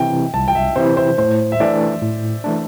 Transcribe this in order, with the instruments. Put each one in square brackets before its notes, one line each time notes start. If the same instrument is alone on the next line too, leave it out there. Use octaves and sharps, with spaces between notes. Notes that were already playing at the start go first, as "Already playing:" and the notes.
Already playing: [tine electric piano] C3 E3 C4 E4 [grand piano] G5
[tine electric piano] C2 [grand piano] A5
[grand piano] G5
E5
[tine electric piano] C3 E3 C4 E4 [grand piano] C5
[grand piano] C5
[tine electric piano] A2 [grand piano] C5
[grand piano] E5
[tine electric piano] E3 A3 D4 [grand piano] D5
[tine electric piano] A2
E3 A3 D4